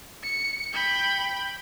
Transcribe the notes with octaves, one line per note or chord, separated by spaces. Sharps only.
C#7
G5 B5